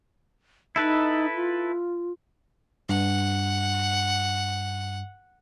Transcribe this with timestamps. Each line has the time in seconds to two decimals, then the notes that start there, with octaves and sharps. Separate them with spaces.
0.76 D#4 E4 A4 B4
1.35 F4
2.89 G2 F#5